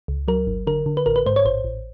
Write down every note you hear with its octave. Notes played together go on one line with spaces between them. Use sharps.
C#2
F#3 A#4
G1
D3 A#4
D3
B4
A1 A#4
B4
G#2 C5
C#5
A1 C5
A1